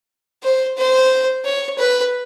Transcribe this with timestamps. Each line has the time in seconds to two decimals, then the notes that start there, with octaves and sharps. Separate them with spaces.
0.43 C5
0.77 C5
1.45 C#5
1.78 B4